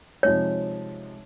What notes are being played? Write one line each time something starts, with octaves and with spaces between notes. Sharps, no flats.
C3 F3 G#3 D#4 C#5